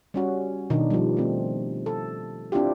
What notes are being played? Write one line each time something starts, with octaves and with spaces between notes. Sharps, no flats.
G3 C#4 F#4
B2 D#3 D4 D#4
F3 G3
A3 C4
A4
C4 D4 E4 F4 G4